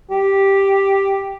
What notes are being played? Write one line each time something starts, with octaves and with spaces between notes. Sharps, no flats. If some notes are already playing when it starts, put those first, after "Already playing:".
G4